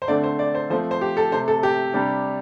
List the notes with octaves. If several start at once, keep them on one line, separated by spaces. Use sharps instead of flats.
C5
D3 A3 C4 D5
C5
D5
C5
F3 A3 C4 C5
C5
G4
A4
C3 A3 C4 C5
A4
G4
C3 G3 D4 G4